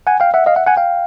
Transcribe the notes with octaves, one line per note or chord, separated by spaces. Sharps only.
F#5 G#5
F5 G5
E5 F#5
D#5 F5
E5 F#5
F#5 G#5
F5 G5